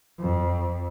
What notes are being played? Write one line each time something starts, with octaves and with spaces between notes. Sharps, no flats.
F2